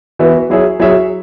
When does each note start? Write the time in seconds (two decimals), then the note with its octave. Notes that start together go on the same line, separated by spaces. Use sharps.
0.19 E3 B3 F#4 B4 E5
0.50 F#3 E4 G#4 C#5 E5
0.80 F#3 E4 G#4 C#5 E5